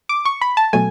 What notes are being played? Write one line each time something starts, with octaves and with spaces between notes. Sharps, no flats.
D6
C#6
B5
A5
B2 F#3 A3 G#5